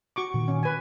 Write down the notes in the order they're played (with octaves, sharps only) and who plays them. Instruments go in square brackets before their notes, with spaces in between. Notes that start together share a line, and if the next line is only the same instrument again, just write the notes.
[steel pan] F#4 C#6 D6
[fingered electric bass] A#2 D#3
[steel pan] C#4
B4 G#5